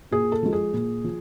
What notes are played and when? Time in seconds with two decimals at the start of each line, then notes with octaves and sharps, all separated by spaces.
0.11 A#2 G#4
0.32 A4
0.43 F3 G#3
0.53 G#4
0.73 A#2
1.04 F3